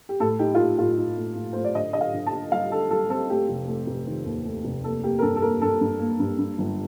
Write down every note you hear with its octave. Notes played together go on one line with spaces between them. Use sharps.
G4
A2 A4
D#4 G4
F4
A3 G4
A2 F4
D#4
A2
A2
A2 C5
D5
D3 D#5
D3 D#5
F5
D3
A5
D3
G3 F5
D3 A4
G3 A4
C4 A4
A3 G4
F1
A3
F1
D#3
D#2
A3
F1
A#3 A4
A#3 G4
A#4
G2 A4
A4
A#3 A#4
G2 A4
G2
A#3
G2
G2
G1